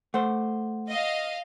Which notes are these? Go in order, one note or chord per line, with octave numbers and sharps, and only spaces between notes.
A3 C5 F#5
D#5 F5